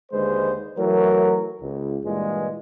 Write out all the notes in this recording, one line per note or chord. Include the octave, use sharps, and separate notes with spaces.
D#2 D3 G#3 B4 C5
E3 F#3 A3 A#4
C#2
G2 A#2 E3 G#3